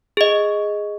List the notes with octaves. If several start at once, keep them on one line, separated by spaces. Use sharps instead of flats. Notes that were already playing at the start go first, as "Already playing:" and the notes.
G#4 D#5